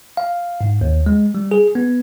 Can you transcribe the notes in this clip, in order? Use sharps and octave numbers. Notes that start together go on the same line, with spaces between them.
F5
G#2
D#2
G#3
G3
G#4
B3